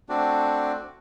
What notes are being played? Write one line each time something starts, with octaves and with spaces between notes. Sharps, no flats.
A3 C4 D4 F#4 D5